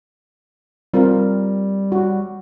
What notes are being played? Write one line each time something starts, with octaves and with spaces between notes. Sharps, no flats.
G3 C4 F4 A#4
F#4